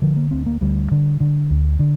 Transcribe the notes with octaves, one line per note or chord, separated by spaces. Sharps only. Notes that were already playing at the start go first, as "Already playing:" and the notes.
D3 F3
A#3
D2 C4
A#3
D2 G3
D3
D3
D2
D3